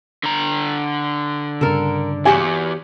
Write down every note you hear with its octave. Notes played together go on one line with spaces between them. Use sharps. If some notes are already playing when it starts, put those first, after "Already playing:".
D3 A#5
G2 C#3 A4 A#4
E2 F#4 G4 C#5 G#5